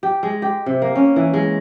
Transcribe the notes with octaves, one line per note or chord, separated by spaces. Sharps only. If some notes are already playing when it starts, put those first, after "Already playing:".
G4
G#3
G4
C3
A#3
C#4
E3
G#3